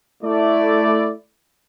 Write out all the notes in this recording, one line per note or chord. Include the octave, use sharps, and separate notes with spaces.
A3 E4 D5